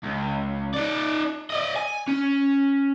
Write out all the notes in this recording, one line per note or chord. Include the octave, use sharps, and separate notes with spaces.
C#2
D#4 D5
D5 D#5
G#5
C#4